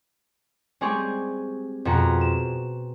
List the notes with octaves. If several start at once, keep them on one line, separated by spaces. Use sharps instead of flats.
G3 G#3 C4 G4 G#4 C#6
F2 B2 F#4 G#4 A#5 C#7
E7